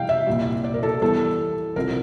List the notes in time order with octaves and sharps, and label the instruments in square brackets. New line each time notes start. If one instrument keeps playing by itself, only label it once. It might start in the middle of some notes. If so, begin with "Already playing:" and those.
Already playing: [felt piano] C3 E3 G3 F5 G5
E5
C2 A#2 G3
D5
A#4
A4
E2 E3 G3 A4
C2 C3 F3 A#4